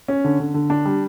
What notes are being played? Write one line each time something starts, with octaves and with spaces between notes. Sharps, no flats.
C#4
D3
D3
D3
D4
G3